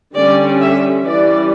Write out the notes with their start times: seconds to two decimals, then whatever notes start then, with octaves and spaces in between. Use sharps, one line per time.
0.16 D3 G3 C#4 D5
0.61 E5
1.06 E3 G3 C#4 D5